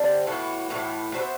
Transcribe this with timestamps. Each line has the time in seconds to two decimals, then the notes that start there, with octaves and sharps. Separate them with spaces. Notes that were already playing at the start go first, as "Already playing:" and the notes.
Already playing: D3 G3 C4
0.26 A2 E3 B3 F#4
0.70 A2 E3 B3 F#4
1.14 B3 F#4 C5 E5